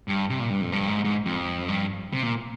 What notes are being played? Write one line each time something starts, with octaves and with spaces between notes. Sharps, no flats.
G2
C3
A#2
G2
F2
G2
G#2
G#2
F2
G2
C3
A#2